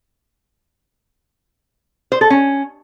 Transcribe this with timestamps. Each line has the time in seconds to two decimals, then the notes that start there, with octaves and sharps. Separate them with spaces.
2.12 C5
2.21 A4
2.30 C#4